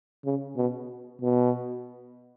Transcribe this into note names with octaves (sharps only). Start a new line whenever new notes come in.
C#3
B2
B2